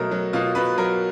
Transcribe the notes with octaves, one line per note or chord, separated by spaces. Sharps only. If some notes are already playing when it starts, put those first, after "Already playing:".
Already playing: B2 F#3 A3 A#4
F#3
B2 F4
B2 B4
F#3 A#4